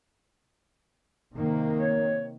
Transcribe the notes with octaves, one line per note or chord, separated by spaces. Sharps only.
C3 D#3 A#3
C#5